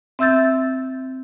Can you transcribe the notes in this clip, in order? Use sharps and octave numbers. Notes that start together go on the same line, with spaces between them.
C4 E5 E6 G6 A6